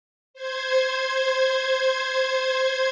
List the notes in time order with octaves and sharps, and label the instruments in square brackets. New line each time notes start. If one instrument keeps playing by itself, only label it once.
[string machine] C5 G#6